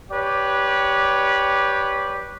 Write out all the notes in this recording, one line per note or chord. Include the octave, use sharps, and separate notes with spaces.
G4 B4 C#5 D5